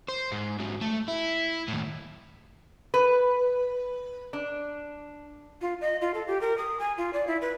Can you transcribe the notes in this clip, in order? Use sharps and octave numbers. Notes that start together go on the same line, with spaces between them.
C5
G#2
G#2 F#3
A3
E4
D#2 A2
B4
D4
F4
D#5
F4
A4
G4
A#4
D#6
G#5
F4
D5
E4
B4